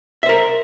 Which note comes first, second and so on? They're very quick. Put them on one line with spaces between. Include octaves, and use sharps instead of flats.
E5 C5 A#4